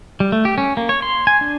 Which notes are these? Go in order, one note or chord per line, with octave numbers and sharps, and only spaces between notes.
G3
A3
G4
C#4
A#3
C#5
C6
G#5
D4